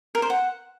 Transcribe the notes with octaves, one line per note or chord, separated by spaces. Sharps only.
A#4
C5
F#5